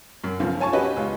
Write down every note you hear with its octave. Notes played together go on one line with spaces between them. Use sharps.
F#2
B1 C#3 F3
C#5 G#5 A5 C#6
C#4 F#4 G4 B4 D#5
C#2